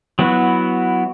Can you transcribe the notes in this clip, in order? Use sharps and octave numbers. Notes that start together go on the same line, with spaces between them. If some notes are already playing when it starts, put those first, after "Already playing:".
F#3 B3 E4 F#4